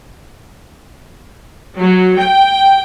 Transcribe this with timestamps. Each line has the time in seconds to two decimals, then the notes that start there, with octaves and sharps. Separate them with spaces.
1.77 F#3
2.19 G5